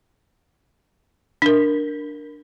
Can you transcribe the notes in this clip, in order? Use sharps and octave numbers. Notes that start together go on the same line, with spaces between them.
D4 A#4